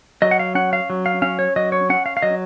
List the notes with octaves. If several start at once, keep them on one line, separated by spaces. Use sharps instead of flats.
F#3 D#5
F#5
F5
C#4 F#5
F5
F#3
F5
C#4 F5
C#5
F#3 D#5
C#5
C#4 F#5
F5
F5
F#3 D#5